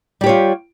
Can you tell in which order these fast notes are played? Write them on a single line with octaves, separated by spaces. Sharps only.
G3 G4 C#5 F4